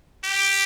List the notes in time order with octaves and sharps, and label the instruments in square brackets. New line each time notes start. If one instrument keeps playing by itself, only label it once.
[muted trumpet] G4